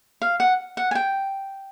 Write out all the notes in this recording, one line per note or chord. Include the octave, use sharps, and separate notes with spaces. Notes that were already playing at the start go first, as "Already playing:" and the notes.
F5
F#5
F#5
G#5
G5